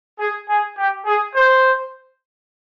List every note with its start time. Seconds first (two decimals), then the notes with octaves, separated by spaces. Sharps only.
0.19 G#4
0.49 G#4
0.78 G4
1.06 G#4
1.35 C5